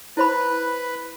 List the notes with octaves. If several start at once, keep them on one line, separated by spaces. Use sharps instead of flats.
E4 B4 C5 B5